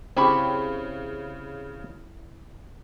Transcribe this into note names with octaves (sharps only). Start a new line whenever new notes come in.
C#3 C4 E4 G4 B5 C#6